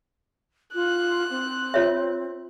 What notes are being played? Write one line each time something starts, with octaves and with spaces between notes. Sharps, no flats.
F4 F#6
C4
F4 C#5 E5